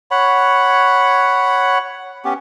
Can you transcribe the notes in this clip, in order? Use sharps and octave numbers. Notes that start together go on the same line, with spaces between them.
C#5 F#5 B5
B3 C#4 G4